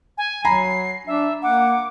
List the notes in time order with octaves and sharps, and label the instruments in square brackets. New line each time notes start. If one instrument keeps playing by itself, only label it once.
[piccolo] G#5
[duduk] F#3 [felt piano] G#5 A#5 B5 [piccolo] C7
[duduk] D4 [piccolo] E5
[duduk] A#3 [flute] F#5 [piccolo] D6